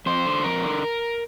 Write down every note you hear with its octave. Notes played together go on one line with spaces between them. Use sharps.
F2 C5
D3
F2 A#4
D3